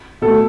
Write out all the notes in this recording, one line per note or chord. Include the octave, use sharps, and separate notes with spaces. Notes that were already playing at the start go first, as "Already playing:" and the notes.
B2 A3 A4